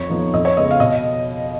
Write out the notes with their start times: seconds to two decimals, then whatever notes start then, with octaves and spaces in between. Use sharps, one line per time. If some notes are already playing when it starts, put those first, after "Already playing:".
Already playing: F2 C#5
0.10 F3 B3 D#4
0.33 F2 D#5
0.45 C#5
0.57 C#3 G#3 B3 D#5
0.71 F5
0.80 B2 D#5